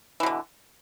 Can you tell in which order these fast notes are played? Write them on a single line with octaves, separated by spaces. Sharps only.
E3 B2 D3